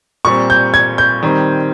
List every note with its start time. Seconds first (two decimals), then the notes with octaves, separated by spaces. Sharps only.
0.25 A#2 G3 C4 C#6
0.50 G6
0.74 G#6
0.98 G6
1.23 D#3 G3 C4